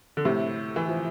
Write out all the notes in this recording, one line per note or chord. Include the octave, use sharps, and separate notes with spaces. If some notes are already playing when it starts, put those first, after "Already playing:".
D3
A2 C3
E3
F3